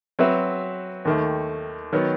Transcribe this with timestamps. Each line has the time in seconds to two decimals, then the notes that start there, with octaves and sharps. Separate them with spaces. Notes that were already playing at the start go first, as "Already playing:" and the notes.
0.19 F#3 C4 F#4 B4 E5
1.05 D#2 D#3 A3
1.93 D#3 F#3 B3